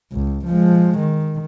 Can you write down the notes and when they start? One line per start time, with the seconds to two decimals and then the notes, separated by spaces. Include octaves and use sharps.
0.12 C#2
0.47 F3 G#3
0.99 D#3